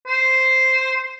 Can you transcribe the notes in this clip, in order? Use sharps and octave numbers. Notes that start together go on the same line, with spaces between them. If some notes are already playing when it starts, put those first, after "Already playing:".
C5